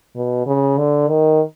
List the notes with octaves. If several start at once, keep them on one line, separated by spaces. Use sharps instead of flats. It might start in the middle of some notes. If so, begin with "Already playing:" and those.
B2
C#3
D3
D#3